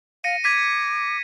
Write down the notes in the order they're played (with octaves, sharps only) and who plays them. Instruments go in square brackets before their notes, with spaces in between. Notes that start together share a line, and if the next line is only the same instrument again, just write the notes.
[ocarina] F5 [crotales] A#6 C#7 D#7
[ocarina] D6 [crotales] G#6 B6 D#7